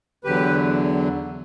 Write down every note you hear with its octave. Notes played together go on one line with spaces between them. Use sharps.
E2 D3 F#3 G4 B4